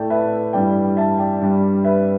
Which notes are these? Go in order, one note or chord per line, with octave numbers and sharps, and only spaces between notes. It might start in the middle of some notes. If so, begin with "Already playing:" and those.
Already playing: A2 A3 D5 G5 A5
B4 E5
G2 E3 G3 D5 G5
E5 A5
D5 G5
G2 G3
B4 E5